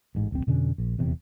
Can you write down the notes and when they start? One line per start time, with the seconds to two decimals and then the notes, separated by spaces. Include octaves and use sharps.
0.15 A1 G#2
0.32 D1 A#1 C4
0.47 F2 B2 D3 C#4
0.78 A#1
0.98 D#1 E2 C3